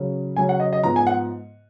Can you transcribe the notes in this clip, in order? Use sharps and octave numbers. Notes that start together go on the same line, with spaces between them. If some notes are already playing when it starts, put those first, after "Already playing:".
Already playing: C#3 F#3 C#4
C#3 F#3 C#4 G#5
F#5
D#5
D#5
G#2 F3 B3 A#5
G#5
F#5